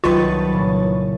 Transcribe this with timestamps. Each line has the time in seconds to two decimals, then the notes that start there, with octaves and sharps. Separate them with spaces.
0.04 C2 D#3 F#3 F4 B4 A5 C#6 A6
0.53 A#2 C#3 E3